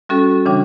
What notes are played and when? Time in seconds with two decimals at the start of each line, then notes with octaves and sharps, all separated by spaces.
0.09 G3 C#4 F#4 A4
0.46 C#3 E3 G3 D4